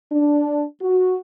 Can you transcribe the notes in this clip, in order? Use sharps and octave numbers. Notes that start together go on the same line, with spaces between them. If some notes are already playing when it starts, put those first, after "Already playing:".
D4
F#4